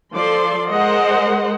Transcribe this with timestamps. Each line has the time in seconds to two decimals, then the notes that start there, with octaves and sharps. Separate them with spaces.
0.14 F3 A4 C5 D5 C6
0.70 G#3 A#4 C5 D#5 F#5 C6